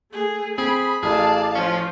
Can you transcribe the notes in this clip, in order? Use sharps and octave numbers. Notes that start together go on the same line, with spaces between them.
A3 G#4
C4 G#4 B5
A1 G#4 D5 F5 A5
F3 C#4 F4